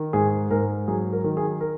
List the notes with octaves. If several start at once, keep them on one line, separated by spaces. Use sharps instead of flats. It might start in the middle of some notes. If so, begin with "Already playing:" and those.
Already playing: D#3
G#2 G#4
G#2 A#4
F#3 G#4
A#4
D#3
G#4
A#4